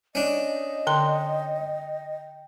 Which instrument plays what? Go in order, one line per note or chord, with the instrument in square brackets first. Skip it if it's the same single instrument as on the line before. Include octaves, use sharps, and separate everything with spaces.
[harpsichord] C#4 D4 [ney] D#5
[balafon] D3 C6 [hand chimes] G5